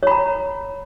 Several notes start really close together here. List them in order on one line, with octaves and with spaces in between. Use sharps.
C#5 B5 A#5